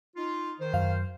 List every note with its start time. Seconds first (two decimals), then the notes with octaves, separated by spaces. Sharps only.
0.17 D#4 F4
0.59 D#3 C5
0.73 F#2 F5